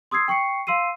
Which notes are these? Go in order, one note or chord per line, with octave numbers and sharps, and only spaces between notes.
C6 D#6 E6 G#6 C7
G5 C#6 C7 C#7
F5 C6 E6 C7 D#7